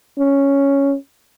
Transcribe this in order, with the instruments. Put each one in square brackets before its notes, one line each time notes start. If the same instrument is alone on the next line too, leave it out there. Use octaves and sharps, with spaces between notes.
[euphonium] C#4